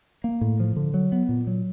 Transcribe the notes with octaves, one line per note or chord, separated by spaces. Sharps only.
A#3
A2
F3
D3
F#3
B3
A#2
F#3